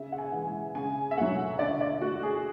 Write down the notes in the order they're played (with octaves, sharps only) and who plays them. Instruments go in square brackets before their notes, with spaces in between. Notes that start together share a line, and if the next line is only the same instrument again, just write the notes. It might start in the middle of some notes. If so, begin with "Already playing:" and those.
Already playing: [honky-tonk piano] C#3 E5
F#5
G#5
E3 G#3
C#3 G#5
E5
F#3 A3 F#5
D3 D5
D5
A3 F#4
G#4